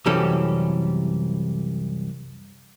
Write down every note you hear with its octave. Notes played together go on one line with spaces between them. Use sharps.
C2 F#2 E3 G3 C#4 A4